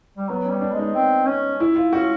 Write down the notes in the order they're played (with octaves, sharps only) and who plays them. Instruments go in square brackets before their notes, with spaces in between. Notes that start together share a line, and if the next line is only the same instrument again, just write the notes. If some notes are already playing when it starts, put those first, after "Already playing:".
[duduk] G3
[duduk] F#3 [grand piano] B3
[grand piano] C#4
[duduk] G3
[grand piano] D4
[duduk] G#3
[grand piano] D#4
[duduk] C4
C#4
[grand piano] E4
F4
[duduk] C#4 [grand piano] F#4